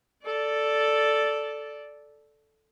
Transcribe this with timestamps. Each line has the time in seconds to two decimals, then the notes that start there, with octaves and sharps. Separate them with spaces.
0.24 A4 D5